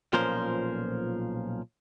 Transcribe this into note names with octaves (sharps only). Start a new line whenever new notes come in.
B1 A#2 F3 C#4 A#4 C5